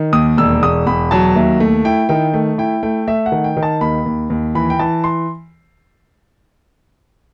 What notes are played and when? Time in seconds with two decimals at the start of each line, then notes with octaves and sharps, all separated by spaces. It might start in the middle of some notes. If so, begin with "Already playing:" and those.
Already playing: D#3
0.13 D#2 D#6
0.37 E1 E6
0.62 E1 D#6
0.86 E1 B5
1.11 F#3 A5
1.35 D#2 E5
1.60 A3
1.85 E4 G5
2.09 D#3 G5
2.34 A3
2.58 E4 G5
2.83 A3 G5
3.08 A3 E5
3.26 F#5
3.32 D#3
3.44 G5
3.57 D#3
3.63 A5
3.81 D#2 B5
4.06 D#2
4.30 D#2
4.55 E3 B5
4.70 G5
4.79 E3 A5
5.04 C6